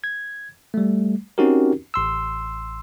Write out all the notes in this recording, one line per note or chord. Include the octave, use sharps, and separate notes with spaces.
G#6
G3 A3
C4 C#4 D#4 F#4 G4 A#4
A1 C6 E6